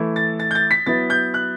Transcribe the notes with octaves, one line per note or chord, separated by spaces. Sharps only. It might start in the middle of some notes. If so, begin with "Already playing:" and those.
Already playing: E3 A3 E4
A6
A6
G6
A6
B6
F#3 B3 E4 A6
G6
F#6